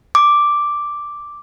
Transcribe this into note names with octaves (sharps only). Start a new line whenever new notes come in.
D6